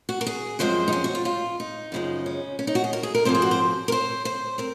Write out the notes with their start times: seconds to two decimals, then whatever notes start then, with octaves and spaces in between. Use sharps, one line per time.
0.09 F#4
0.21 A#4
0.26 G#4
0.59 F#2 F3 G#3 C4 C5
0.88 D#4
0.93 C#4
1.04 F#4
1.15 F4
1.25 F4
1.60 D#4
1.92 F#2 C#3 F3 G#3
2.26 C#4
2.59 C#4
2.67 D#4
2.75 F#4
2.84 G#4
2.93 A#4
3.03 G#4
3.15 A#4
3.25 G#2 F3 C4 C5
3.35 G#4
3.42 F#4
3.51 C5
3.88 A#4
3.92 C5
4.25 C5
4.58 C4 A#4